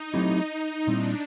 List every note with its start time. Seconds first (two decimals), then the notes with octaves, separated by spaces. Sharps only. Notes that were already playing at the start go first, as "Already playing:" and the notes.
Already playing: D#4
0.14 F#3 A3 C4 E4 G4
0.87 A#2 G3 C4 D4 E4